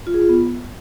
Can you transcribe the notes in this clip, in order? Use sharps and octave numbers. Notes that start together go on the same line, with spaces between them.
F4
G#4
F4
B3